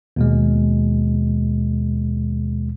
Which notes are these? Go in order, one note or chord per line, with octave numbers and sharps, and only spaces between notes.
D#2 B2 G#3